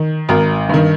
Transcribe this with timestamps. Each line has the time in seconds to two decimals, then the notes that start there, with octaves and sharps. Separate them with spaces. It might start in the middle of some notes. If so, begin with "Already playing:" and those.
Already playing: D#3
0.29 G#1 A#4
0.69 G2 D#3